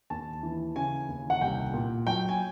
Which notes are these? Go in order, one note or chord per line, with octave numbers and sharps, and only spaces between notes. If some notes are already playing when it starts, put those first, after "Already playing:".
D#2 A5
E3
C#3 G#5
D#2
F#5
C2 G5
A#2
F#3 G5
G#5